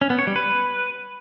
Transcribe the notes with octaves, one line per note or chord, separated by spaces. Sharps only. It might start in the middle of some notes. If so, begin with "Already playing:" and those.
C#4
B3
C#5
G3
B4